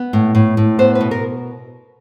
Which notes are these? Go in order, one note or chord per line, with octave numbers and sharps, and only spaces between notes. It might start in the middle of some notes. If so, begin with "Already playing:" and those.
Already playing: B3
A2
A2
A2
B3 C5
B4
B2
A#4